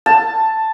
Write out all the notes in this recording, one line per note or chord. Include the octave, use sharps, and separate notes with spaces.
A5